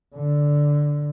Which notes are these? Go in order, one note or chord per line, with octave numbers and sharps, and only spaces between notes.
D3